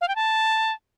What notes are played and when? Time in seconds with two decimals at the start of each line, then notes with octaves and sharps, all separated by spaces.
0.01 F5
0.08 G5
0.16 A5